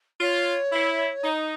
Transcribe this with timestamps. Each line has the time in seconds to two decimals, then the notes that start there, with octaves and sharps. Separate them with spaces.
0.21 F4 C#5
0.72 E4
1.24 D#4